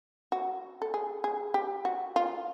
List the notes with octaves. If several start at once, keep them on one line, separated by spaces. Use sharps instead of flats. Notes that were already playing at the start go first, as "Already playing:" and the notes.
F#4
A4
G#4
G#4
G4
F#4
F4